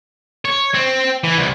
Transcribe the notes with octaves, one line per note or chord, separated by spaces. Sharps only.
C#5
C4
E3
C2